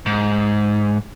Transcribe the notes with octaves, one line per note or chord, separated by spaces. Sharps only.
G#2